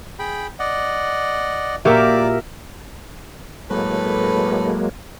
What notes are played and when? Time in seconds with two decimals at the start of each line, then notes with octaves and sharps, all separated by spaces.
0.19 G#4 G5 B5
0.59 D5 D#5 F#5
1.85 A#2 A#3 F#4 G4 A#4 D5 E5 D6
3.71 A2 F#3 G#3 A#3 A4 B4